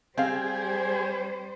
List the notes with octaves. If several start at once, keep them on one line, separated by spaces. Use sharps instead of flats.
G3 C4 G4 G#4 C5 F5